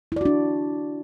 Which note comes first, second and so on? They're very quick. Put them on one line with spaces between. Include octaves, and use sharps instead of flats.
E4 D5 F#4 D4